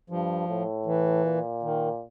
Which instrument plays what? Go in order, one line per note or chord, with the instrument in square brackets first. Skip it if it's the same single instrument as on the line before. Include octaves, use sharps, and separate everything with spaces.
[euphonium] G2 [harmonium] F3
[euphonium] A2
[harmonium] E3
[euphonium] A#2
[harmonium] D#3